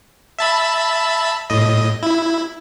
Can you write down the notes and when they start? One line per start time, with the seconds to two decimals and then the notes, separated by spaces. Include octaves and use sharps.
0.39 E5 A5 B5
1.50 A2 D#5
2.03 E4